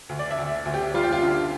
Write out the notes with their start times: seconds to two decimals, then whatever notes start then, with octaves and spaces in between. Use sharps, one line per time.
0.09 D2
0.19 D5
0.31 E5
0.38 D2
0.65 D2
0.74 G4
0.94 G3 F4
1.03 G4
1.12 F4
1.23 D3